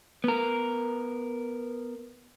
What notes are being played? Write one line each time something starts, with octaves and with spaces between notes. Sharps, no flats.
B3 A#4